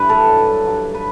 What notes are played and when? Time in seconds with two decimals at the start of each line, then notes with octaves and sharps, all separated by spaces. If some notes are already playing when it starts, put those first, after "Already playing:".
Already playing: G2 E3 B4
0.09 A4
0.28 G2 F#3
0.66 G2 F#3
0.94 B4